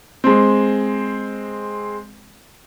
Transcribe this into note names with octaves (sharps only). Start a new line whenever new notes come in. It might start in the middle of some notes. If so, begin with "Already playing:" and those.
G#3 C4